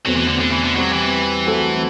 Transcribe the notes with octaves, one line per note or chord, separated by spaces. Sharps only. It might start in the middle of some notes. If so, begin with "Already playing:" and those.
E2 B2 F#3 A3 C4
E3
D3
D3
E3
D3
F#3 G3 C4 G4
E3
F#3 A3 C4 F#4 A4